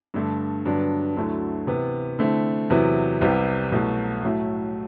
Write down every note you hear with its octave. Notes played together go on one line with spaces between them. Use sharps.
G2 D3 A3
G2 D3 F#3 B3 D4
D2 D3 F#3 A3 E4
C3 E3 B3
D3 A3 C4 E4
E2 C3 F#3 B3 E4
C2 C3 G3 B3
C2 B2 F#3 A3
A2 F#3 A3 E4